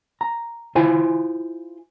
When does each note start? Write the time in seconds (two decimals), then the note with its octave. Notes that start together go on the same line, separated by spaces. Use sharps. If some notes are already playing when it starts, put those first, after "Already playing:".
0.21 A#5
0.75 E4 F4 C5 G#5